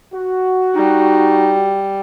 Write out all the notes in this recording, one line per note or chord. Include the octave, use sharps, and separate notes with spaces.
F#4
G3 D#4